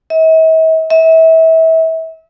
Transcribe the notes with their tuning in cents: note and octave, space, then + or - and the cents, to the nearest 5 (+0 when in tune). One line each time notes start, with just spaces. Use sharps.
E5 -45
E5 -30